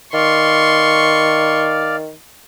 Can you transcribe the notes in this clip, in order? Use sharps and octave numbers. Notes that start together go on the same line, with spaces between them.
D#3 D5 F5 C6 C#6